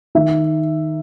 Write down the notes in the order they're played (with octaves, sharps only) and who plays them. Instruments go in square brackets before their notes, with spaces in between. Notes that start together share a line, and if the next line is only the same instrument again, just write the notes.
[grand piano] D#3 E5